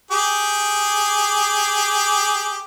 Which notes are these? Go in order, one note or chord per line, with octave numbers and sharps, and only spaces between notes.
G4 G#4